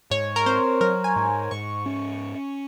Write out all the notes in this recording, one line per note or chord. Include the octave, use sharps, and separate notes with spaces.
G#2 C#5
A#4
C4 C5
F#3 A#4
G#5
G#2
G#2 C#6
C#4